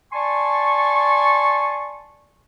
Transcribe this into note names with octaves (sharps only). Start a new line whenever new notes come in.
D5 G#5 A5 C6 C#6